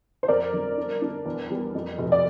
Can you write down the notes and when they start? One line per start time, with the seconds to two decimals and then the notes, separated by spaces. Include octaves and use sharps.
0.23 C5
0.28 F2 A#4 D5
0.53 G1
0.77 D4
1.02 D4
1.26 E2
1.50 G3
1.74 F2
1.98 F1
2.12 D5